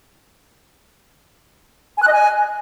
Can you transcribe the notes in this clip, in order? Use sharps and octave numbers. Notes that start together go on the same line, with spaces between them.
G#5
F#6
D#5
G#5